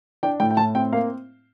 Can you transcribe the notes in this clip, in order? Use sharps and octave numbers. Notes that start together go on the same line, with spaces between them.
D4 G5
A2 G5
G5
A2 A5
C4 G5
A#3 F5